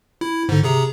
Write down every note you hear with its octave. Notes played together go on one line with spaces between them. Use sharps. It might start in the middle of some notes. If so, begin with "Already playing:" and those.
E4
G#2 D3
C3 G#4 A#5